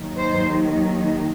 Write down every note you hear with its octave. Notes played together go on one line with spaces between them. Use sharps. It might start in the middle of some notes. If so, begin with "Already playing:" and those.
Already playing: D#2 D#3 F#3
C5